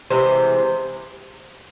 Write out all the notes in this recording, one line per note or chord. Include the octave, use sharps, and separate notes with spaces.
C3 E3 G#3 C5